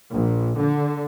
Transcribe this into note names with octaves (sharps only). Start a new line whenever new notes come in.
A#1
D3